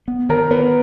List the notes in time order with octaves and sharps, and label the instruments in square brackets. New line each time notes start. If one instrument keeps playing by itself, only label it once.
[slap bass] B3
[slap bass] D#3 [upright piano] A#4
[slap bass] B3 [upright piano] B4